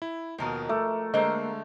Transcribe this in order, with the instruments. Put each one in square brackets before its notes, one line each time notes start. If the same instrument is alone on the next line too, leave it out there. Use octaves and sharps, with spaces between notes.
[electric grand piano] E4
[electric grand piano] D#2 B2 [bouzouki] F3 G#3 A#4
[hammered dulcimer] A3 [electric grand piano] D6
[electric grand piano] D3 G#3 E6 [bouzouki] A#3 C5 F#5 [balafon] D#5